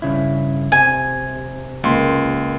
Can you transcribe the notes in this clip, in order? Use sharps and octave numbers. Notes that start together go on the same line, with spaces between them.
G2 C#3 E4
C3 G#5
C#2 C#3 A#3 C6